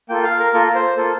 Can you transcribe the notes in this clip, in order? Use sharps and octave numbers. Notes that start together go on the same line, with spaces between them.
A#3 F4 A4 G5
F5
A#4
A#3 F4 A4 A#4
C5
A#3 F4 A4